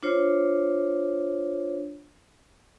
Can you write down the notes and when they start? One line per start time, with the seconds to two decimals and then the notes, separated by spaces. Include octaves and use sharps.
0.03 D4 F4 C5 C#5